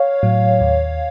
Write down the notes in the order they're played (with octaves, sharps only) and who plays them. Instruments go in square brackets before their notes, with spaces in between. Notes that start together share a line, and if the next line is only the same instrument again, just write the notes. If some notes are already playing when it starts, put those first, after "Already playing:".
Already playing: [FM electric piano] C#5 F5
A2 F#3
D#2